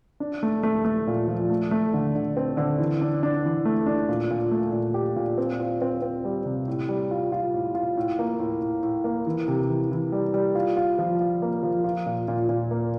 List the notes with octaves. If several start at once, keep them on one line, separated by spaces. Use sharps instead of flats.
D4
A3
A3
A3
A#2
F3
A3
A3
D3
D3
C4
D3
E3
D4
D4
E3
A3
D4
A#2
A#2
A3
A#2
G4
A#2
C4
F4
C4
C4
G3
C3
A2
G3
F4
F4
A2
F4
A2
A#3
A2
A2
A2
A#3
E3
C3
E3
E3
G3
G3
F4
F4
F3
F4
A#3
F3
F4
A#2
A#2
A#2
A#3